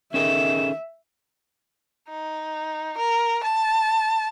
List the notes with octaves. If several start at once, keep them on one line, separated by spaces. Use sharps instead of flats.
D#3 C#4 G#4 A4 E5 E7
D#4
A#4
A5